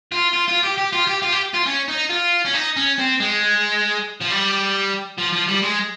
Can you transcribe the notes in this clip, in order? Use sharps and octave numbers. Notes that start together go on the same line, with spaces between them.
F4
F4
F4
G4
G4
F4
G4
F4
G4
F4
C#4
D#4
F4
C#4
D#4
C#4
C4
G#3
F3
G3
F3
F3
G3
G#3